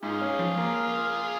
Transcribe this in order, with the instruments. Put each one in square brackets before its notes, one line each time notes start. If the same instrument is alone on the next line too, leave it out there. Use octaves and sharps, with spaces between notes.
[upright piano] G#2 [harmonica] F4 G#4
[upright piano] C#4
F3
A#3